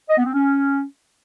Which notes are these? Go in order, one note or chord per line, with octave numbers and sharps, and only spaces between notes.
D#5
B3
C4
C#4